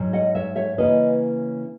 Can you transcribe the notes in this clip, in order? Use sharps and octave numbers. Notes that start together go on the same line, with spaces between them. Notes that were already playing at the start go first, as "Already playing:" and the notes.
Already playing: G#2 F#3 C#4
D#5 F#5
C#5 E5
C#5 E5
C#3 E3 A#3 C#4 B4 D#5